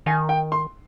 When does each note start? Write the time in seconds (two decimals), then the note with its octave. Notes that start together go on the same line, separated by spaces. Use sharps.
0.06 D#3 G#5
0.29 G5
0.52 C6